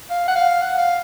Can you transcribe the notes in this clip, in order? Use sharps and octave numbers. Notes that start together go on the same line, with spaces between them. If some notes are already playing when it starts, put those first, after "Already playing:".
F5
F#5
F5
F#5
F5